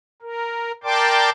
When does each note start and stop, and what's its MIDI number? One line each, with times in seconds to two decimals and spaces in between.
0.22 0.72 70
0.84 1.30 70
0.84 1.30 74
0.84 1.30 79
0.84 1.30 81
0.84 1.30 84
0.84 1.30 86